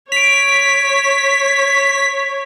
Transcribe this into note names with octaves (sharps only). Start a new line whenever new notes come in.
C#5 B6 D7 F7